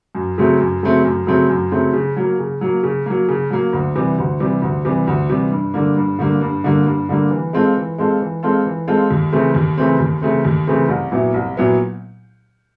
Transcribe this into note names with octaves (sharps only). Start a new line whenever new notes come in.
F#2
C#3 F#3 A3 C4
F#2
C#3 F#3 A3 C4
F#2
C#3 F#3 A3 C4
F#2
C#3 F#3 A3 C4
C#3
F#3 A#3
C#3
F#3 A#3
C#3
F#3 A#3
C#3
F#3 A#3
D2
C3 E3 G3
D2
C3 E3 G3
D2
C3 E3 G3
D2
C3 E3 G3
G2
D3 G3 A#3
G2
D3 G3 A#3
G2
D3 G3 A#3
G2
D3 G3 A#3
E3
G#3 C4 F4 A4
E3
G#3 C4 F4 A4
E3
G#3 C4 F4 A4
E3
G#3 C4 F4 A4
D#2
C#3 E3 A3 C4
D#2
C#3 E3 A3 C4
D#2
C#3 E3 A3 C4
D#2
C#3 E3 A3 C4
C2
A#2 F#3 B3 E4
C2
A#2 F#3 B3 E4